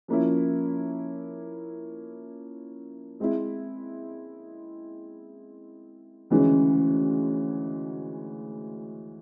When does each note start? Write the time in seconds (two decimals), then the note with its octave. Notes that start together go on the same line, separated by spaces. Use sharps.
0.08 F3 A#3 C#4 E4
3.20 G#3 C4 E4
6.30 D2 C#3 E3 G#3 C#4